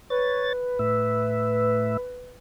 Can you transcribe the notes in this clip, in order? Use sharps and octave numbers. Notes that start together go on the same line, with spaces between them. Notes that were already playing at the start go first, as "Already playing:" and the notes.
B4 C#5 A6
A2 E5